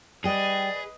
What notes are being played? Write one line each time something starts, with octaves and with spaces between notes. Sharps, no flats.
G3 G#4 B4 D5 D#5 G5